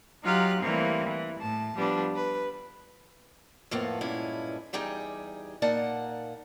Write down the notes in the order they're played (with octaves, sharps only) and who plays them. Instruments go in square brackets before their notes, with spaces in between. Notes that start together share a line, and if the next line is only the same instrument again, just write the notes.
[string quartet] F#3 D#4 F4 G4 F5 F#6
E3 G3 A3 A#3 C4
E3
A2 A5
F3 G3 B3 D4
B4
[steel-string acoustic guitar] F2 A2 A#3 B3
G2 A#2 G#3 C#4 E4
E2 G3 D#4 G4 G#4
A#2 A#3 D#4 D5 F#5 A5